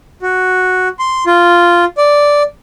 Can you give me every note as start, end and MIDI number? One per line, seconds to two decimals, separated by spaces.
0.22 0.88 66
0.99 1.24 84
1.26 1.85 65
1.98 2.43 74